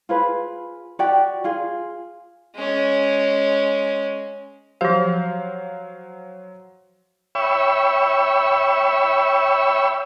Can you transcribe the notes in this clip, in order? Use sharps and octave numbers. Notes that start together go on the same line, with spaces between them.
F4 G#4 B4
F#4 G4 D5 G5
F4 G#4
G#3 C#4
F3 F#3 G4 C5 F5
C#5 E5 G5 B5 C#6 E6